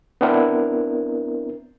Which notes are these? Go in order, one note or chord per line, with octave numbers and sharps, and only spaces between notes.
B3 C4 D4 E4 A#4